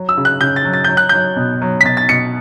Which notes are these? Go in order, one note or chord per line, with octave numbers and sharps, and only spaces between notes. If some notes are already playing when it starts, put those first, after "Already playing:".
Already playing: F#3
E6
C#3
F#6
C#3 G6
A6
F#3
A6
F#3 G6
F#6
F#3 G6
B2
F#3
B6
B2 A6
A6
B2 C#7